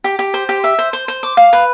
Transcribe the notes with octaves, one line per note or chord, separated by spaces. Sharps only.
G4
G4
C5
G4
E5
C5
C5
C5
D6
F5
B4